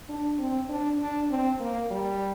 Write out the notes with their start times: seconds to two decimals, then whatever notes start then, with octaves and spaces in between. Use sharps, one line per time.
0.09 D4
0.39 C4
0.69 D4
1.00 D4
1.30 C4
1.61 A#3
1.91 G3